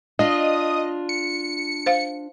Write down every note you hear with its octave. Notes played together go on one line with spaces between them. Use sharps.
D4 F4 D#5
C#7
C5 F5